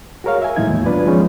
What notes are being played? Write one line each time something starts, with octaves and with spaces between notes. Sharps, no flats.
F#4 G#4 A#4 C#5 F5
E5 G#5
A2 E3 F#3 G#3 D#4 G#6
D#2
F#3 B3 D4 F4 B4 D5
F3 G#3 C#4 D#4 G#4